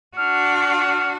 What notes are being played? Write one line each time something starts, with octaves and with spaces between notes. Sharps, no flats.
D4 F#4 F6